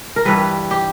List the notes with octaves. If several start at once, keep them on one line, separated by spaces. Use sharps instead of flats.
A#4
G2 E3 G3 B4
G4